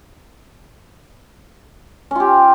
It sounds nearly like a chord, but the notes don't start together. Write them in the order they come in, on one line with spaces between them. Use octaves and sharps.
C#4 F4 G4